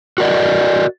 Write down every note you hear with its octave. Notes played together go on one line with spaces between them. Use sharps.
F#4 A#4 D5 D#5